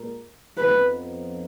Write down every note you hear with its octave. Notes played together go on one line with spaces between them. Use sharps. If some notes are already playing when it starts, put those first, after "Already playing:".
Already playing: A#2 G#3 A#4
F2 F3 B3 D#4 B4